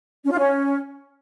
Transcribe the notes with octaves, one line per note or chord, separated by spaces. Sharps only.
C#4
F4
C#4